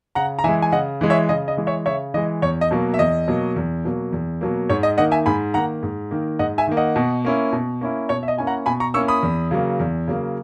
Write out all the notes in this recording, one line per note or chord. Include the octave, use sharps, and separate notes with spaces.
C#3 F#5 A#5
A#5
E3 G#3 E5 G#5
G#5
C#3 D#5 F#5
E3 G#3
C#5 E5
C#3 D#5
D#5
E3 G#3
C#5 E5
C#3 C#5 E5
E3 G#3 D#5
E2 C#5
D#5
B2 F#3 A#3
E5
E2 D#5
B2 F#3 A#3
E2
B2 F#3 A#3
E2
B2 F#3 A#3
G#2 C#5
D#5
D#3 A#3 D#5 F#5
E5 G#5
G#2 G#5 B5
D#3 A#3 F#5 A#5
G#2
D#3 A#3
G#2 D#5 F#5
E5 G#5
D#3 A#3
D#5 F#5
B2
A#3 C#4 E4
B2
A#3 C#4 E4
B2 C#5
E5
D#5
A#3 C#4 E4 G#5
F#5 A#5
B2 G#5 B5
A#5 C#6
A#3 C#4 E4 C#6 E6
B5 D#6
E2
C#3 F#3 A#3
E2
C#3 F#3 A#3